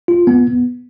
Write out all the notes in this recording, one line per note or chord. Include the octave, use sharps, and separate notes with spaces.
F4
B3